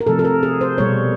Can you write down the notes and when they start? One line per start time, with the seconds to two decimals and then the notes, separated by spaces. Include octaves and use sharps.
0.01 A#4
0.07 C3 F3 A3 A4
0.19 A4
0.25 A#4
0.43 G#4
0.61 C5
0.78 B2 G3 A#3 C#5